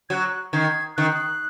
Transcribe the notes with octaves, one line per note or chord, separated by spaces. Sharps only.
F#3 F#6 G#6
D#3 G#6
D#3 F#6